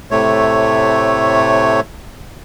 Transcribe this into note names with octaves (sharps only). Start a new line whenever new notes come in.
A2 C3 A3 C#5